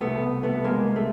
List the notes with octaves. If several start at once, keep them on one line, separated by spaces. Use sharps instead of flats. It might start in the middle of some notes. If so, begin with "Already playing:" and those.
C2 B2 A3 B3
A3 B3
G#3 A#3
A3